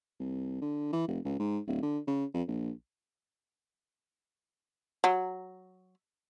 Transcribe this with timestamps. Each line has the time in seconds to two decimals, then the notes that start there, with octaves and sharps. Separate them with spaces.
0.20 C2
0.62 D3
0.93 E3
1.08 F1
1.25 C#2
1.39 G#2
1.67 D1
1.83 D3
2.08 C#3
2.34 F2
2.48 A#1
5.04 F#3